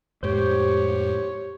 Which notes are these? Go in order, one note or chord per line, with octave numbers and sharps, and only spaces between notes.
F2 A2 G#3 G4 C5 C#5